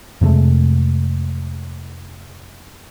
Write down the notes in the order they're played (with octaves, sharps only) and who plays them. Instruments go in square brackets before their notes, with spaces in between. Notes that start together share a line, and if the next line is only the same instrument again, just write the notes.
[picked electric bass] F2 C3 G#3 A3